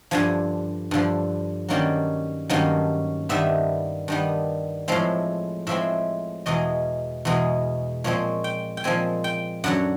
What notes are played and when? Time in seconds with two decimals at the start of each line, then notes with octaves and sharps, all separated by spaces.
0.11 G2 D3 F3 G#5
0.91 G2 D3 F3
1.69 G2 D#3 F#3 A#3 C#4 D5
2.50 G2 D#3 F#3 A#3 C#4
3.29 G2 D#3 G3 B3 E5
4.08 G2 D#3 G3 B3
4.88 A2 F3 G#3 C4 F5
5.67 A2 F3 G#3 C4 E5
6.46 E2 B2 G#3 D#5
7.25 E2 B2 G#3
8.04 A#2 F3 G#3 C4 C#5
8.44 G5
8.77 G5
8.84 A#2 F3 G#3 C4 G#5
9.24 G5
9.64 F#2 D3 F#3 F#5